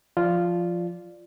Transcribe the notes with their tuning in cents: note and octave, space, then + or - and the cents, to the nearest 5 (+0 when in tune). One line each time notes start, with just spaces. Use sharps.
F3 +0 F4 -5 D5 +0